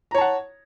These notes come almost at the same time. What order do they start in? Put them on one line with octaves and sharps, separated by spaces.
A#5 C#5 A5 F#5